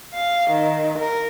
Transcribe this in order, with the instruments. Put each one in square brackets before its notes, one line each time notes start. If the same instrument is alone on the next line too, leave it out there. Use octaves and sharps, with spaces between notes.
[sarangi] F5
D#3
A#4